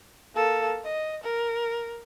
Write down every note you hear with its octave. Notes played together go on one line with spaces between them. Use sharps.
A#3 A4
D#5
A#4